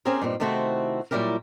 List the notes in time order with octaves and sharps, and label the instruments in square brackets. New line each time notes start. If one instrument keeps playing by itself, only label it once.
[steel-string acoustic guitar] C4 C#4 G4 G#4 A#4 C5
G2 A#2 C4 D#4
C3 D#3 A3 C4 E4 F#4
A#2 F#3 G3 E4 G4 A#4